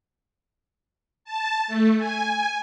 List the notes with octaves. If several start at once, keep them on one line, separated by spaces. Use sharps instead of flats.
A5
A3
G#5